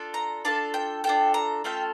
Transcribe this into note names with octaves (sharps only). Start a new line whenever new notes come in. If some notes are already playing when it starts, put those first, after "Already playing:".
Already playing: D4 F4 A4
A#5
D4 F4 A4 A5
G5
D4 F4 A4 G5
A#5
A3 C#4 F4 A4 G5